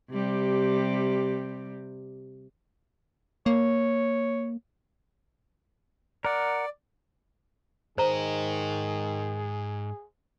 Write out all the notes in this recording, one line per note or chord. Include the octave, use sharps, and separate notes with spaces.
C3 G3
A#3 C#5
A#4 D5 F#5
G#2 D#3 G#4 C5 D#5 A#5